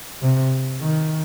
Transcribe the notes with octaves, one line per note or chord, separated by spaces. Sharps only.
C3
D#3